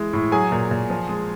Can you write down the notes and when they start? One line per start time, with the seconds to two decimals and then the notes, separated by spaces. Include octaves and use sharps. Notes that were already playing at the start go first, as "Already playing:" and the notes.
Already playing: E3 G#3
0.13 A2
0.32 F#3 G#4 G#5
0.52 A#2
0.71 A#2
0.90 F3
1.09 G#3